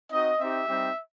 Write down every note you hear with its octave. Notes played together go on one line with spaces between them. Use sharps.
C4 D#4 F#4 D#5
C4 D#4 G4 E5
G3 C4 D#4 G4